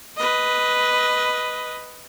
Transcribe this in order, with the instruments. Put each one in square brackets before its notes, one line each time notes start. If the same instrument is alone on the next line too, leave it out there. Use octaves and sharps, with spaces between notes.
[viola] B4 D#5